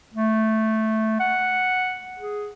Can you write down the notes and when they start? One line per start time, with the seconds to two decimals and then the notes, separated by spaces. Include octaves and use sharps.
0.14 A3
1.20 F#5
2.18 G#4